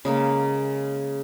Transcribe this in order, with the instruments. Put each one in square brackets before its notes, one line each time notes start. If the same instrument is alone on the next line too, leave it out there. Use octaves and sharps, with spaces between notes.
[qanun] C#3 G#3 A#3